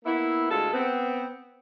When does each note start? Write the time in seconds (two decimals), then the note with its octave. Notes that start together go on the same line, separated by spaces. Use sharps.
0.05 A#3 B3 E4
0.50 D2 G#3 F4 A4
0.73 B3 C4